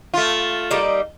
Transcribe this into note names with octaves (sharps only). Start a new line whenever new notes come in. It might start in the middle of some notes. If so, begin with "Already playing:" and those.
A3 F4
G3 A#3 D#4